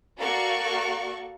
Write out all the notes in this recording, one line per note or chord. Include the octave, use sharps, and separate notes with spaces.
A#3 F#4 A4 D5 F5 C#6